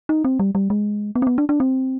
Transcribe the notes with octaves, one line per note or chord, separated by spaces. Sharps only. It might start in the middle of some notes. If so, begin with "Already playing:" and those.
D#4
C4
G3
G3
G#3
B3
C4
B3
D4
D4
C4